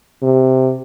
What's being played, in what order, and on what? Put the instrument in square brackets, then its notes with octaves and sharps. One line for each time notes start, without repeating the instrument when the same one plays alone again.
[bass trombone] C3